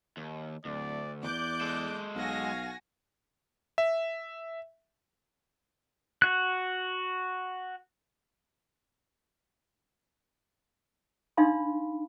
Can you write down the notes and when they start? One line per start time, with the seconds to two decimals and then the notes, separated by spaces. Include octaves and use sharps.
0.17 D#2
0.65 D1 D2 D5
1.23 E2 D5 D6 F#6 G6
1.61 G#3 A4
2.16 B1 F#4 F5 G#5 A#6
3.78 E5
6.22 F#4 F#6
11.37 D4 D#4 F5 B5 C6